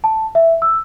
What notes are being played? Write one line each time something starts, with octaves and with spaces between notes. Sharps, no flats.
A5
E5
E6